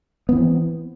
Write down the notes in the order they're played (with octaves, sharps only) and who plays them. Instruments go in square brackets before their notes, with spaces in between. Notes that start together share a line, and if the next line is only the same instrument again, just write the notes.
[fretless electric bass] B3
E3
C4